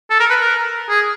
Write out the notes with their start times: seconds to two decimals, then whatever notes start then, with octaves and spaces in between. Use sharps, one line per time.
0.10 A4
0.20 A#4
0.30 B4
0.40 A#4
0.89 G#4